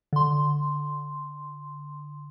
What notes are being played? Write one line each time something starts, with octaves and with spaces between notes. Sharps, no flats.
D3 C6